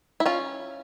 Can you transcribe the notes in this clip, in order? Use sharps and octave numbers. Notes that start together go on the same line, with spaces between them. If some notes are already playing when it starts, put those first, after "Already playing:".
E4
C#4 F4